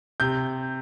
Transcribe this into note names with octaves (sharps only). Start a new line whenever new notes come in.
C3 G6